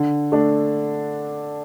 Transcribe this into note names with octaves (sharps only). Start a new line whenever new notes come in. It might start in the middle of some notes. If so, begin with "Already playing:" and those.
Already playing: D3
A3 D4